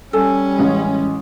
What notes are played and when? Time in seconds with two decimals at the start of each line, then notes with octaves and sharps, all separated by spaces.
0.13 G3 C#4 A4 G#5
0.59 A1 G#3